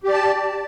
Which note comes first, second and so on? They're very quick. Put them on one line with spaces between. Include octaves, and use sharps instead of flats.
G4 D5 A5